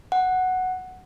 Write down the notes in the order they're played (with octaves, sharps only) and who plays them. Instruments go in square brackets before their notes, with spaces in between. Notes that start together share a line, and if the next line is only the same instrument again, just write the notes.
[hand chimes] F#5